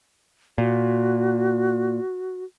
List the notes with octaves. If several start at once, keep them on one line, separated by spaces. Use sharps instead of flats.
A#2 F#4